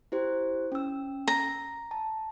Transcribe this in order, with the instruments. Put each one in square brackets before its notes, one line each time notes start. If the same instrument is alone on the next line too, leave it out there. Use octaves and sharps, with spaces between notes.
[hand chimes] E4 G4 C5
C#4 E6
[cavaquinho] A#5
[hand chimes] A5